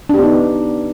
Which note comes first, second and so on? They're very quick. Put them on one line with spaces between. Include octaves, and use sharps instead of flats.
D4 G4 B3 D#4